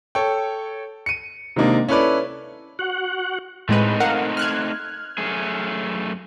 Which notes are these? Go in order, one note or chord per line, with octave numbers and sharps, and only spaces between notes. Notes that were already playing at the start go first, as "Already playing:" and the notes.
A4 C#5 G5
C#7 D#7
C3 D#3 G#3 A#3 D4 D#4
C#4 E4 A4 B4 D5
F#4 F#5
A2 G#3 A3 C4 D#4 B4
A#4 F5 F#5
F6 F#6 G#6
F#2 A3 G#4